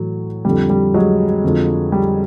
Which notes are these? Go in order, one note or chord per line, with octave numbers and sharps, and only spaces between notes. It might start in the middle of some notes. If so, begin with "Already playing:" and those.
Already playing: A2 E3 F#3
F2 D3 F3 G3
G3
F#3 G#3
F2 D3 F3
G3